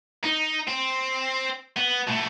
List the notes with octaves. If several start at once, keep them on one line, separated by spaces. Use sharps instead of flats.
D#4
C4
B3
B2 A3